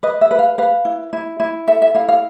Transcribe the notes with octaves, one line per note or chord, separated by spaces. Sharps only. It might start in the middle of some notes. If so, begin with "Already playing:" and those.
B4 D#5
E5
B4
F5
B4 F5
E4
E4
E4
A4 E5
E5
E4 F5
F5